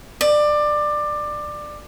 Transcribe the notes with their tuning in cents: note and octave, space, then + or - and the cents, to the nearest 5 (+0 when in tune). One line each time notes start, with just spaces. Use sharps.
D5 +20